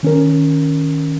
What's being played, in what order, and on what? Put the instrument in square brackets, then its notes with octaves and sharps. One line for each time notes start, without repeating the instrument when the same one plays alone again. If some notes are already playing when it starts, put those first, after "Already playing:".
[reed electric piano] D#3 C#4 A#4